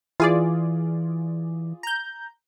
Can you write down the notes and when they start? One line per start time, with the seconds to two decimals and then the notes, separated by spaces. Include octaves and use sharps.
0.20 E3 F4 G#4 D5
1.83 A#5 G6